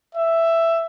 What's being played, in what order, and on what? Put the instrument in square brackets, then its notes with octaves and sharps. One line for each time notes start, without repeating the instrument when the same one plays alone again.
[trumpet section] E5